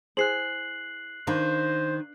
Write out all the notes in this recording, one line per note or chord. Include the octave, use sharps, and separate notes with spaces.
E4 G#4 C5 F#6 C7 F#7
D#3 D4 C5 F5 B5